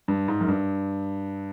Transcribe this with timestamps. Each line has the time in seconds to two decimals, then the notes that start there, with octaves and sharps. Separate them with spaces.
0.08 G2
0.28 G#2
0.41 F#2
0.48 G2